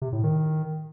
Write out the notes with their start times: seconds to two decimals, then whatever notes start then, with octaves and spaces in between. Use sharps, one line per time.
0.02 C3
0.13 A2
0.24 D#3